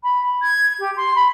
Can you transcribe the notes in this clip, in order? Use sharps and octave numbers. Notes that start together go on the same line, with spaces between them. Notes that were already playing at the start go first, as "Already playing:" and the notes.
B5
G#6
G4
C6
B5